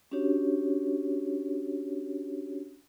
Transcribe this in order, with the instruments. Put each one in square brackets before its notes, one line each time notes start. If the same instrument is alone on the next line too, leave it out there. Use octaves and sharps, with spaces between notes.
[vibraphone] C#4 D4 F#4 G4 C#5